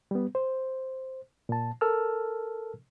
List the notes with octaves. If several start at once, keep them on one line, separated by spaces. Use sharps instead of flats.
G3 B3
C5
A#2 A5
A4 A#4 A5 E6 F6